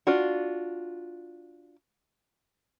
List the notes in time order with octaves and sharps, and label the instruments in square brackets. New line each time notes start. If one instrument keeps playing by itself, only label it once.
[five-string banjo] D4 F4 F#4